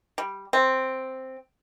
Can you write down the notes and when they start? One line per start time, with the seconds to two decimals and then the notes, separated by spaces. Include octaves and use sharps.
0.18 G3
0.53 C4